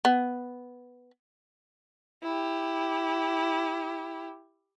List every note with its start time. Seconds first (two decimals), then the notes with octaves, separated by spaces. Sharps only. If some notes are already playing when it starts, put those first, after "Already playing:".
0.05 B3
2.23 E4 G4